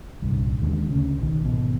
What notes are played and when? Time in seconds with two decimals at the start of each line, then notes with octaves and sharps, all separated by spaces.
0.22 D#1 C2 G2
0.61 D#2 D3 G#3
0.90 D2 C#3
1.18 B1 D#3
1.44 G#1 B2